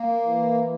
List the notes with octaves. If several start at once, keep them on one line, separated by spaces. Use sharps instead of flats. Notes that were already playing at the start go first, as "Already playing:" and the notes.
Already playing: A#3
E3